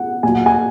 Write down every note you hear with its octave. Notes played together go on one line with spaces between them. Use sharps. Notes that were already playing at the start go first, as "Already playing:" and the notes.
Already playing: B2 F#5
A#2 F#3 G#5
F#5
G#5